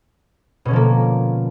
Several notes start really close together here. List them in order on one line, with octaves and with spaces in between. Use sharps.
B2 C#4 D3 F3 A#3